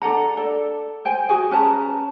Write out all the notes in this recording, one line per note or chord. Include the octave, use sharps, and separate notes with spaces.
D4 A4 F#5 A#5
A4 D5
C5 G5 G#5
F#4 G#4 G#5
C#4 B4 A5 A#5